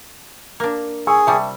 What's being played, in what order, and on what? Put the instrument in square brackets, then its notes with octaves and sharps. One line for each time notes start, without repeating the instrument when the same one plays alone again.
[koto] A#3 D4
[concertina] G#4 [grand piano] G#5 C#6 E6
[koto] C3 G3 [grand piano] E5 A5 C#6